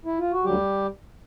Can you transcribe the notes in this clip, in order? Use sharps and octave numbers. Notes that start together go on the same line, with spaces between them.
E4
F4
F#4
D2 D3 F#3 G3 G4